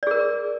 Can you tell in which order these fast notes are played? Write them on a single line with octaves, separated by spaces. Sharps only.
D5 G#4 A#4